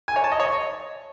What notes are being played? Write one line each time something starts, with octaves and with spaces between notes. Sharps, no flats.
G#5
C#5
A5
D#5
C#5